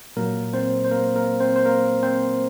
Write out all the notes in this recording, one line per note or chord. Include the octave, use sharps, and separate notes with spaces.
A#2 F#3 A#3 A#4
C4 C5
C5
A#3 A#4
A#3 A#4
C4 C5
C5
A#3 A#4
C4 C5